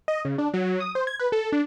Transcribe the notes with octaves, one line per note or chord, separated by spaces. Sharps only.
D#5
C#3
D4
F#3
D#6
C5
G#6
B4
A4
D4